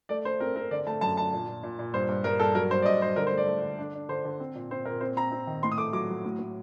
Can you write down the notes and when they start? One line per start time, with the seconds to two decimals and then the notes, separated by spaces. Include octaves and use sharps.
0.09 A3 D5
0.25 A3 C5
0.40 C4 A#4
0.55 C4 A#4
0.71 D3 D5
0.86 A3 A5
1.01 F#2 A5
1.17 D4 A5
1.33 A#2
1.48 A#2
1.63 A#2
1.79 A#2
1.93 G2 C5
2.09 G2
2.24 G2 A#4
2.39 G2 A4
2.55 F#3 A#4
2.71 G2 C5
2.82 D5
2.86 G2 D#5
3.01 G2 C5
3.16 D3 A#4
3.27 C5
3.32 A3
3.38 D5
3.47 A3
3.62 D3
3.78 D4
3.94 D4
4.09 D3 C5
4.25 D3
4.40 C4
4.55 A#2
4.71 C4 C5
4.85 A#2 A#4
5.01 C4 C5
5.17 C4 A#5
5.32 C4
5.47 D#3
5.63 A2 C6
5.72 D#6
5.78 A3 D6
5.93 F#3 D6
6.09 F#3
6.25 A2
6.39 A2